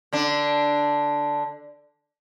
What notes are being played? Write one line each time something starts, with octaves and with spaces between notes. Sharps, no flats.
D3 D4